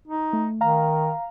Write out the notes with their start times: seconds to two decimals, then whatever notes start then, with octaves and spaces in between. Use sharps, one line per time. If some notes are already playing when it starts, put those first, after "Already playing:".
0.07 D#4
0.33 A3
0.61 D#3 F5 A#5